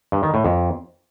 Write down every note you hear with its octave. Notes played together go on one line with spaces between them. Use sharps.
G2
D#3
A2
F2